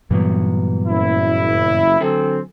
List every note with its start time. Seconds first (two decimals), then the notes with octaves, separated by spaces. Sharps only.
0.11 G2 A#2 E3 F#3 G3 B3
0.87 F#1 E4
2.01 D3 F#3 C4 A4 G#5